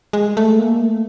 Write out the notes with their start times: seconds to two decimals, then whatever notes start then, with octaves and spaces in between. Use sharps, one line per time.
0.13 G#3
0.37 A3
0.59 A#3
0.81 A3